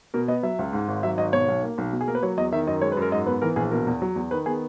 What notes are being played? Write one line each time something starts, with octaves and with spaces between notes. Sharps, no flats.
B2 A#4
B3 D#5
F#3 E5
C#2
G#2
G#1
F#3 E5
G#1 D#5
B2 C#5
B1
A#3
B1
B2
G#4
A#3 A#4
B4
F#3 C#5
E2 D#5
D#3 E5
F#2 D#5
G#3 C#5
B4
F#2
A#4
G#2 D#5
B3 B4
E3 A#4
A#1 G#4
B2 A#4
E2
F#3
E2
D#3 B4
B3 G#4